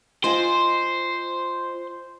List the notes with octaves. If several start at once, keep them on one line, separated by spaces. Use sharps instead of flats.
F4 C5 D#5 G#5